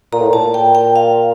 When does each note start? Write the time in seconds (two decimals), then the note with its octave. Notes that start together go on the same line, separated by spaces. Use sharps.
0.13 A#2 A#5
0.21 A2
0.30 A#2 A5
0.54 G5
0.75 G5
0.96 F5